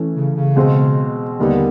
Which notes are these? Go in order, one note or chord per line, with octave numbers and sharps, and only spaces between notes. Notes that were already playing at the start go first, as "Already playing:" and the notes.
Already playing: E3 A3 C#4
C#3
C#3
B2 G#3 C4
D#2 D3 D#3 G3 B3